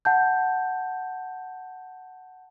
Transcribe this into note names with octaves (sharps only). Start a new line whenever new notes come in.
F#5 A5 G6